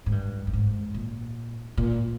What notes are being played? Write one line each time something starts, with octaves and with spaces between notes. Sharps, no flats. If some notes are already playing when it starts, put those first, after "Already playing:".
G#2
G2
G2
G#2
A#2
A#2